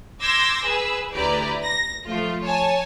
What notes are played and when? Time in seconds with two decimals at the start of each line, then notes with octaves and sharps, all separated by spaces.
0.21 C6 D6 E6 G6 G#6 A#6
0.62 G#4 B4 E6
1.13 D2 E4 G4 B4 D5 A#5
1.62 A#6
2.05 F3 A3 F4
2.43 C#5 G#5 A5